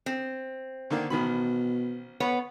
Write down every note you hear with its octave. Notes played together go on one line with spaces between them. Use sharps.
C4
D3 D#3 A#3
A1 B2 D#3 B5
B3 C#5